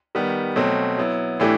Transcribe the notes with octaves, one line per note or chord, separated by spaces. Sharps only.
D#3 G3 B3
B2 F#3 A3 C4
F#3 B3 E4
A2 E3 A3 D4 G4